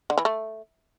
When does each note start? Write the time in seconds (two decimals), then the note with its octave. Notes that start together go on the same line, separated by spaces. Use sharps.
0.10 D3
0.18 E3
0.25 A3